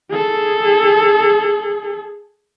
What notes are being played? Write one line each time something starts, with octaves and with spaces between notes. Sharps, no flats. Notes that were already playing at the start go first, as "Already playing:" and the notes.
G#4 A4